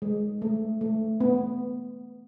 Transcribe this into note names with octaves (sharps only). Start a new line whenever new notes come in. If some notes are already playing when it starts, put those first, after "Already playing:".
G#3
A3
A3
B3